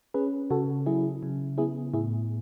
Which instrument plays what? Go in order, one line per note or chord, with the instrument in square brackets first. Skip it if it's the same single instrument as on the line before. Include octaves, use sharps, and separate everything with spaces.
[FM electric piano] C#4 G#4 B4
C#3 F#4 A4
F#3 E4 G#4
C#3
B3 E4 G#4
A2 E4 G#4